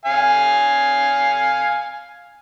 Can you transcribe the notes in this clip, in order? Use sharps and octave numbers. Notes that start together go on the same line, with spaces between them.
F5 G#5